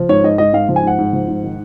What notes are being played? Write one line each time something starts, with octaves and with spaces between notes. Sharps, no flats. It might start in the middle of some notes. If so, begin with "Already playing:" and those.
Already playing: F3
G#2 C#5
G#2 D#5
G#2 D#5
G#2 F5
F3
G#5
G#2 F#5
G#2
F3
G#2
D#3